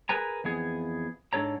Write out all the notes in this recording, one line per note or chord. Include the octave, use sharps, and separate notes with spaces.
G#4 A#4 B4 G#5 A#5
F2 E3 B3 G#4
G#2 D4 A4 C#5 A#5